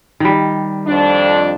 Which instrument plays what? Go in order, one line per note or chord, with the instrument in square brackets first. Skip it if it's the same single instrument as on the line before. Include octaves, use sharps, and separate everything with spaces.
[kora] D#3 G3
[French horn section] F2 D4